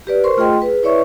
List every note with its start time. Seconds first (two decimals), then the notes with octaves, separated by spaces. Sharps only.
0.07 G4 B4 D5
0.24 A#4 C5 C6 C#6
0.37 A3 F4 G#4 D#5 G5 C6
0.62 G#4 B4
0.83 E4 B4 C#5 D5 E5 C#6